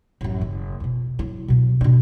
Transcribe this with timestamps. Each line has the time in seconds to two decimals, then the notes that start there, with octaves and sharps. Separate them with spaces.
0.21 A1 F#2
0.41 F#1
0.80 F2 B2
1.19 F#3 E4
1.48 B2 F#3
1.81 B2 D4